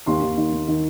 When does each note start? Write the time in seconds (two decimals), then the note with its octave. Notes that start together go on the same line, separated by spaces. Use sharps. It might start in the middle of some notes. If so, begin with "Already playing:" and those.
0.06 D#2 C6
0.22 D#2
0.37 D#3
0.52 D#2
0.68 D#3